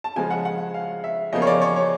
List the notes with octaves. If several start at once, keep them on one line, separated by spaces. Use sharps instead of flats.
A5
C#3 F3 G#3 G#5
F#5
F#5
F5
E5
E2 C#3 F3 A#3 D#5
C#5
D5
C#5
C#5